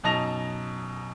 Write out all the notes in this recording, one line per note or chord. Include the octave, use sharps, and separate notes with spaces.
F#2 B2 D#4 A5 A#6 F7